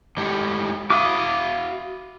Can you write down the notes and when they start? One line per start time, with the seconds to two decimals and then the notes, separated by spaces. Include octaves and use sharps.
0.17 A2 G#3 G4
0.90 F#4 E5 F5 D6 D#6